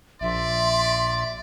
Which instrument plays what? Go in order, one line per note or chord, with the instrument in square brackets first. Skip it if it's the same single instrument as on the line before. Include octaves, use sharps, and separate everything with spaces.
[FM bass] A#1 [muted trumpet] D5 [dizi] E5 [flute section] C6